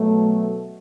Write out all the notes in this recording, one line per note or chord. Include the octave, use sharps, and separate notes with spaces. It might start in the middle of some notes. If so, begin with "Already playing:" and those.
Already playing: B2 F#3 A3